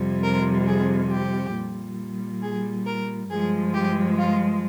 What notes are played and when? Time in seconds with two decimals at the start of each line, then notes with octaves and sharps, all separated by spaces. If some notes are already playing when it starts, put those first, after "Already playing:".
Already playing: F2 C3 G3
0.23 A#4
0.67 G#4
1.11 G4
1.55 A#2 G3
2.42 G#4
2.86 A#4
3.30 G2 F3 G#3 G#4
3.74 G4
4.18 F4